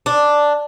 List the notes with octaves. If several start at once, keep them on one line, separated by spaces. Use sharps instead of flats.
D4